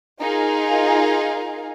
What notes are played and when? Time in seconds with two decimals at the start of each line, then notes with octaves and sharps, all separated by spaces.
0.22 D#4 F4 G#4 A#4 F5